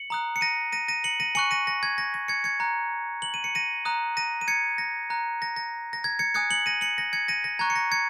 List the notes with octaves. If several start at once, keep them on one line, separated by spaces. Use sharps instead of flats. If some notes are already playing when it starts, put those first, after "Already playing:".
Already playing: C#7 F#7
A#5 D#6 F#6
C#7
A#6 D#7
A#6 D#7
A#6 D#7
C#7 F#7
A#6 D#7
G#5 C#6 F#6 C#7 F#7
A#6 D#7
A#6
G#6
A#6
A#6
G#6 C#7
G#6 C#7
A#5 F#6
F#7
D#7
C#7
A#6 D#7
A#5 D#6 F#6
A#6 D#7
D#7
G#6 C#7
A#6
A#5 F#6
A#6
A#6
A#6
G#6
G#6 C#7
G#5 D#6 F#6 G#6 C#7
C#7 F#7
A#6 D#7
C#7 F#7
A#6
G#6 C#7
A#6 D#7
A#6
A#5 C#6 F#6 G#6
C#7
A#6
G#6 C#7